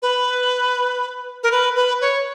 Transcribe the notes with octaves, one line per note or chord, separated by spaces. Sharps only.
B4
A#4
B4
B4
C#5